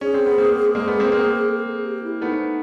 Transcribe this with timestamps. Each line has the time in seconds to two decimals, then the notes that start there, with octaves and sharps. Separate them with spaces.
0.01 C#4 G#4
0.14 C4
0.26 B3
0.38 A#3 C4
0.75 G#3 A#3 G#4
0.87 A3 B3
1.00 A#3 C4
1.12 A#3 C4
1.49 A4
1.67 G#4
1.85 G4
2.03 E4
2.22 A3 B3 D#4